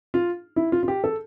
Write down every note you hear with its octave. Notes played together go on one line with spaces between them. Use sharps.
F4
E4
F4
F4
G4
A4